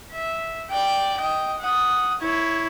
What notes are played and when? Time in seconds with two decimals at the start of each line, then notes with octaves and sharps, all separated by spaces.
0.13 E5
0.71 D5 G5
1.17 D#5 G5
1.60 F#5 D#6
2.20 E4 C#5